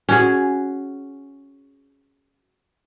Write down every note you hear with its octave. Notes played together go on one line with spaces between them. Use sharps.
C#4 F#4 G#4